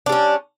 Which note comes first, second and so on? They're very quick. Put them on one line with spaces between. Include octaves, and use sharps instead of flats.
D4 G3 C#4